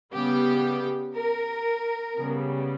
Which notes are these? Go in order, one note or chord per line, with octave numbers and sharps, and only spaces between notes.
C#3 G3 B3 G4
A#4
C#3 G3 B3